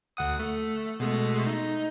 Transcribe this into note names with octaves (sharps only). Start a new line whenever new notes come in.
D2 F#5 D#6
A3
B2 G#3 A3
D#4